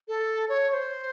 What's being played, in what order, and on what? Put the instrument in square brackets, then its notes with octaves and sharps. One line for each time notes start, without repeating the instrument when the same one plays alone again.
[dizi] A4
C#5
C#5
C5